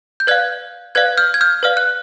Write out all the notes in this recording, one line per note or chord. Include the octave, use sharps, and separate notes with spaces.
G6
B4 D5 F5 F#6 G#6
B4 D5 F5 F#6 G#6
F6 G6
G#6
F6 G6
B4 D5 F5 F6
F#6